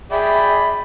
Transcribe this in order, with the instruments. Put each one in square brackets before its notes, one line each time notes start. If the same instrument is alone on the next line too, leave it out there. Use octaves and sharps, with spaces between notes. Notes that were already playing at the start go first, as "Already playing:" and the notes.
[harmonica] G#4 D5 G5 [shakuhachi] E5 [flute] B5